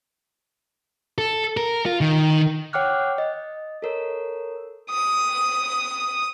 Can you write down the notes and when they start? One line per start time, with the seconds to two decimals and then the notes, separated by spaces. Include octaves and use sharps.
1.18 A4
1.57 A#4
1.86 F4
2.01 D#3
2.73 C#5 F#5 G5 D6 F6 F#6
3.18 D#5
3.82 A4 A#4 C#5
4.91 D#6